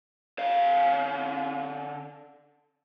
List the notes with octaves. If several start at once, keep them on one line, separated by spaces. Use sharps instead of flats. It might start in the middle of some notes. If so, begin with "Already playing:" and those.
D3 F5